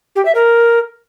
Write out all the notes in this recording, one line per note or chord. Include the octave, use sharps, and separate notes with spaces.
G4
E5
A#4